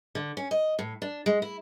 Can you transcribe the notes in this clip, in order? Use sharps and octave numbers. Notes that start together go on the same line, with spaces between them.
D3
C#4
D#5
A2
D4
G#3
E4